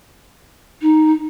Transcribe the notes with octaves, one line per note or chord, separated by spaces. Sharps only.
D#4